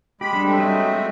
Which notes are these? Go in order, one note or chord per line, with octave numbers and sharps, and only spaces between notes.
G#3 G4 B5
G3 D4
G#3 A3 C4
F#3 D#5 G6
D#6 E6